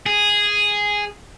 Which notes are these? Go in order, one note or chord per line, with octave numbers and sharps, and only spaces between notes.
G#4